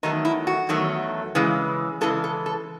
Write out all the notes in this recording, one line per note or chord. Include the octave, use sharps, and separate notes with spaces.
E2 D#3 F#3 A3 D#4
E4
F#4
E2 D#3 F#3 A3
C#3 E3 G#3
C#3 E3 G#3 A4
A4
A4